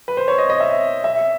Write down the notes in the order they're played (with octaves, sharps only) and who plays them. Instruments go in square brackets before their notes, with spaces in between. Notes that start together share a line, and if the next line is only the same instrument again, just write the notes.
[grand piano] B4
C5
C#5
D#5
D#5
E5
E5